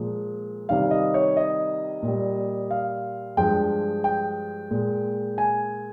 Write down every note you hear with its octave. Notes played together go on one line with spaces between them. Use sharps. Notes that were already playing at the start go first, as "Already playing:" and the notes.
Already playing: A#2 F3 G#3
C3 D#3 G3 F5
D#5
C#5
D#5
A#2
G3
F5
G2 F3 G#3 G5
G5
A#2 G#3
G#5